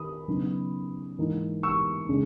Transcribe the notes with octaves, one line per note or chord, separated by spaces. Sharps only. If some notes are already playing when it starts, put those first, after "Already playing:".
Already playing: D#3 B5 D#6
C#3 F#3 B3 D#4
G#2 E3 A#3 D#4
C#6 E6
C#3 G#3